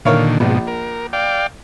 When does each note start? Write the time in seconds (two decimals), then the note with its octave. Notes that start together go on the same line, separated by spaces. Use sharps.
0.05 A#2 D3 D#3 A#4 C#5 F5
0.40 A#1 G#2 B2 F3
0.67 A#4
1.13 D5 F5 G5